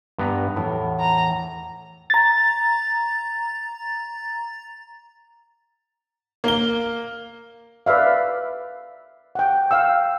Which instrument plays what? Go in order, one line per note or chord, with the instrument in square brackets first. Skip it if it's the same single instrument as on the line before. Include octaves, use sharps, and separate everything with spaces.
[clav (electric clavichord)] G2 B3 A#5
[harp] E2 [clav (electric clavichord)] A2
[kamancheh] A#5
[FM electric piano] A#5 A6
[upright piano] A#3 G7
[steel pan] B4 D5 E5 F5
F#5 G5
F5 G5 E6